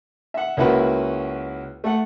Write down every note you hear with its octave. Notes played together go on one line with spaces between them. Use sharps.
E5 F#5
C#2 A#3 E4 F#4 B4
A3 F#5